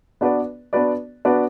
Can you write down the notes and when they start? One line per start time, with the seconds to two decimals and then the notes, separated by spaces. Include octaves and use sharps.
0.21 B3 D4 F#4 B4 D5
0.73 B3 D4 F#4 B4 D5
1.25 B3 D4 F#4 B4 D5